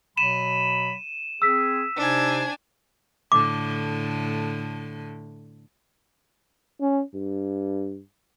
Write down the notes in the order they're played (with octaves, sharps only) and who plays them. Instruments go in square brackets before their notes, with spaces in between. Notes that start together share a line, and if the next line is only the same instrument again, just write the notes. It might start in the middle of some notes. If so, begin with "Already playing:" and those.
[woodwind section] B2 F#3 B5 [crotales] D#7 E7
[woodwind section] C4 G#4 [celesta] E6 B6
[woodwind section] C3 D#4 C5 [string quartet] D4 G#5
[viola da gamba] A2 D3 [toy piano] D6
[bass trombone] C#4
G2